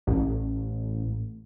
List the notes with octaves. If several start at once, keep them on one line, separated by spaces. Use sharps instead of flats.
A1